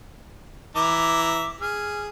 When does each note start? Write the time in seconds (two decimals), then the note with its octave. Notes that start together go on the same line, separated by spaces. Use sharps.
0.75 E3 E5 A#5 D6
1.61 G#4 F6